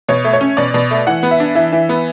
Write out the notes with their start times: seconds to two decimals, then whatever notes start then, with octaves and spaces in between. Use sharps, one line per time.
0.09 B2 C#5
0.24 A3
0.33 C#5
0.41 C#4
0.57 B2 D5
0.74 B2
0.91 A3
1.07 E3 F#5
1.23 B3
1.31 E5
1.40 D4
1.55 E3 E5
1.72 E3
1.89 B3